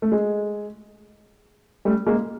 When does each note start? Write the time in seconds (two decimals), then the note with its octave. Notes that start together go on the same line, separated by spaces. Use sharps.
0.02 A3
0.12 G#3
1.85 G3 A3
2.06 G#3 A#3